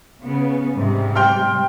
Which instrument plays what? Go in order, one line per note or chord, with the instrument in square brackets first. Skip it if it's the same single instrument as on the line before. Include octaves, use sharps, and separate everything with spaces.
[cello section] C#3 B3
G#2 C3 G3
[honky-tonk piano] G5 C6 F6